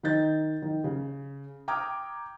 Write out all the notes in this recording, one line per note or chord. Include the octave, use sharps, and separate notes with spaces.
D#3 D#4 D#5 G6 A6
D#3
C#3
G5 A#5 D6 D#6 F6 G#6